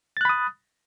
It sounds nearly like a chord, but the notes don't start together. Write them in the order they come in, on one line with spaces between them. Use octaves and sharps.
A6 F#6 B5 D#6